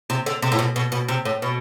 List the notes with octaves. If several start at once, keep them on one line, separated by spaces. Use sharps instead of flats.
C3
D3
C3
A2
B2
B2
B2
C3
A2
B2